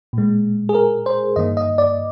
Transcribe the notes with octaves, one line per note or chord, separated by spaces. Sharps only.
A#2 G#3
G#4
A#4
C5
G2 D#3 A#3 D#5
D#5
D5